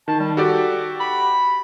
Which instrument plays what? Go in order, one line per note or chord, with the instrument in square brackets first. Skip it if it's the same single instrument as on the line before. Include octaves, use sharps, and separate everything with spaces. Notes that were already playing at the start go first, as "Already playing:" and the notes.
[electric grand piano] D#3 [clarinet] A5
[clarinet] G3
[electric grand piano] F#4 G4 D5 [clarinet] A4
[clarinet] B5